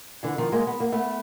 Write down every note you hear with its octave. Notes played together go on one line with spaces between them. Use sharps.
D3 E3
D#3 F3
G#3 A#3
B3
A#3
A3 B3